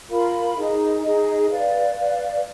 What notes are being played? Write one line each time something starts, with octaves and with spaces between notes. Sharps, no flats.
F4 A#4 F5 B5
D#4 G#4 D#5
D#4 G#4 D#5
B4 D5 F5
B4 D5 F5